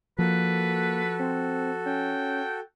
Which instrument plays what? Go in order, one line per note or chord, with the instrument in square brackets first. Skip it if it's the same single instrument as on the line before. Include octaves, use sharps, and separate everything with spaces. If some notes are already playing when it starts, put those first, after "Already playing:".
[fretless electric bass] F3 [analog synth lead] A#3 [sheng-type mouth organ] F#4 A4 [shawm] B4
[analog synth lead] C4
[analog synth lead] C#4 [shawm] G5